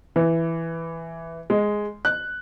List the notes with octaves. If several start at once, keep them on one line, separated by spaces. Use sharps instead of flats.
E3
G#3
F#6